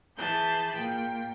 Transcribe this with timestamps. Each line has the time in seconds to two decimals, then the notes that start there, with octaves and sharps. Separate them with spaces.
0.17 E3 G#4 A5 B5 G6
0.75 A#2 G5